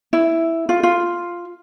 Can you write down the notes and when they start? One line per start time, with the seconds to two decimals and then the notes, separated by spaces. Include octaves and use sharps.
0.13 E4
0.69 F4
0.83 F4